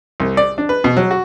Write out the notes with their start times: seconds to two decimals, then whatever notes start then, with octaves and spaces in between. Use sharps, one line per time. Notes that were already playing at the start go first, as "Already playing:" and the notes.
0.20 C2
0.37 D5
0.58 D4
0.69 B4
0.84 B2
0.97 F#3
1.11 F#4